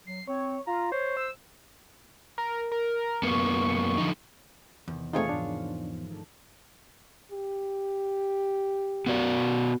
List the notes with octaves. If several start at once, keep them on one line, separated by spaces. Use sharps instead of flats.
F#3 C7
C4 C#5
F4 A#5
C5 C#5
E6
A#4
A#4
F#2 A#3 B3 C#6
D3 F3 D#4
E2 C3 D#3 C4
A#2 A3 C4 D#4 F4 G#4 A#4 C#5
G#2 E3 F3 D4
D#3 A3 D4
G4
B3 F#4 D5